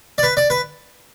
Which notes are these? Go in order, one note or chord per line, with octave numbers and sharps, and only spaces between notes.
D5
B4
D5
B4